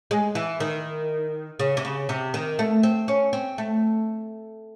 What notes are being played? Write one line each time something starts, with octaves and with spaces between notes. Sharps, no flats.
G#3
E3
D#3
C#3
C3
C#3
C3
D#3
A3
C4
C#4
C4
A3